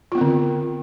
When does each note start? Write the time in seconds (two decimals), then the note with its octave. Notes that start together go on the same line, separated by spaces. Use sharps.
0.12 F4
0.15 B3
0.18 C4
0.21 D3